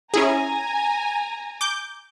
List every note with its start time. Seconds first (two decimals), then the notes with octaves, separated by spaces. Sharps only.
0.14 C#4 E4 G#4 G#5 A#5
1.61 D6 G6